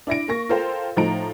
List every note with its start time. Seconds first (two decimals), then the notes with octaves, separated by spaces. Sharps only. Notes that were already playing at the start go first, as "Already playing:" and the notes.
0.07 D4 E4 A#6 D7
0.28 A#3 C#6 A#6
0.49 F4 A4 A#4 C5 F5 G5
0.97 A2 F3 D#4 A#5 D7